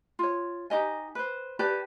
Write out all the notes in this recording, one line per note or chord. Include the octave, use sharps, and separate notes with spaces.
F4 C#5
D#4 G4 D#5 G#5
B4 C5
G4 B4 D5 A5